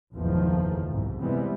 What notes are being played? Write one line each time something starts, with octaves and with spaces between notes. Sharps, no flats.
F#1 B1 E2 G#2 D#3 F3
C2 G#2
C3 E3 G3 G#3 B3